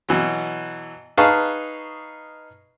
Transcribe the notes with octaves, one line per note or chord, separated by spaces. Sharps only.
B2 E3 F#3
D#4 G#4 B4 F5 A5 C#6